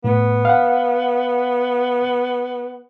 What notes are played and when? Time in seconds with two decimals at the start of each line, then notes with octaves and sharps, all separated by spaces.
0.04 A2 B3
0.45 F5 F#5